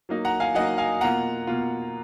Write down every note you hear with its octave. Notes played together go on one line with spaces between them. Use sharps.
F#3 A#3 D#4
F#5 A#5
F5 G#5
F#3 A#3 D#4 D#5 F#5
F5 G#5
B2 A#3 F4 F#5 A#5
B2 A#3 F4